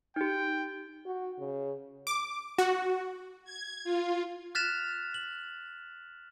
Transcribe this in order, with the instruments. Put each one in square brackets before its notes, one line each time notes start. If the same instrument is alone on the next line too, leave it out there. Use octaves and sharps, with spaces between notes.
[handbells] D#4 G4 [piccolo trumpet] G5
[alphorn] F#4
C#3
[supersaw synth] D6
F#4
[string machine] G#6
F4
[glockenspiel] F6 F#6 A6 B6 E7 F7
F#7